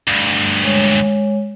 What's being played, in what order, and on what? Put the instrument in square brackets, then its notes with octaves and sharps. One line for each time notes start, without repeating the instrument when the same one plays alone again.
[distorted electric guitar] D2 G2
[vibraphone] G#3 C#5